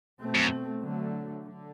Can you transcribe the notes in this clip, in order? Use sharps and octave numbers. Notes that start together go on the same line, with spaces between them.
B2 A3 C4
F#2
D3 F#3 A3
D3